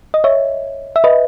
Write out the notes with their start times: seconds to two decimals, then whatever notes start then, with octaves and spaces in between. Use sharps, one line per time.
0.14 D#5
0.24 C#5 E5
0.96 E5
1.04 B4 D#5